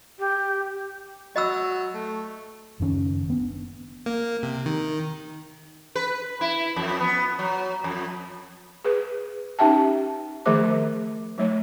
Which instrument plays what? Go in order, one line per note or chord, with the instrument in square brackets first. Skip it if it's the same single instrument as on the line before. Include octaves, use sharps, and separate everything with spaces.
[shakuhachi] G4
[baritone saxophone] F#3 [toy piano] D#5 B5 E6
[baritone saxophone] A3
[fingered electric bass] F#1 D#3 C#4
B3 D4
[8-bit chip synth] A#3
C3
D#3
[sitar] B4
E4
F2
B3
F#3
F2
[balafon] G#4 B4
C#4 D#4 G4 E5 G5 A5
D#3 F3 A3 G#4 C5 D6
F#3 A3 C#5